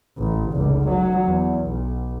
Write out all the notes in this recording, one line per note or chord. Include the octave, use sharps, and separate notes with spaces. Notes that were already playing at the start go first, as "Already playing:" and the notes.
A1
F1 C#2
F#3
E2
B1